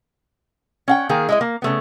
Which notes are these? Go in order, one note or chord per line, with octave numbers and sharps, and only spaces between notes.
C#4 F#5 G5
D#3 A#3 G#4
G#3 E4 D#5
A#3
C#3 A3 B3